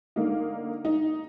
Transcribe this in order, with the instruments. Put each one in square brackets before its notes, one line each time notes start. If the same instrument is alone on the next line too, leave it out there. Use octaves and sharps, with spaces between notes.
[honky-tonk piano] D3 A#3 D#4
D#4